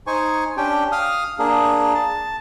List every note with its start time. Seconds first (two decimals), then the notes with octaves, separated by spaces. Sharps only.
0.07 D#4 C5 G#5 C#6
0.57 C#4 D4 G4 G5
0.92 F5 D#6 F6
1.39 A#3 D4 G#4
1.95 A5